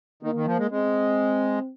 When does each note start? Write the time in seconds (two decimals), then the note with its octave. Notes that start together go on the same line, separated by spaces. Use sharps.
0.23 D#3 A#3
0.35 D#3
0.46 F3
0.59 G#3
0.71 G#3 C4